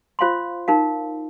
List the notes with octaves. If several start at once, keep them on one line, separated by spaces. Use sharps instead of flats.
F4 C5 F5 C6
D#4 A#4 F5